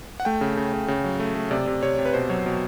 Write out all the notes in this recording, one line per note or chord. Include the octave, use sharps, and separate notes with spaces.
F#5
A3 G5
C#3
C#3
C#3
C#3
F#3
A3
A3
C3 D5
C3
C3 C#5
C3
B4
B2 C5
F#3 C#5
B2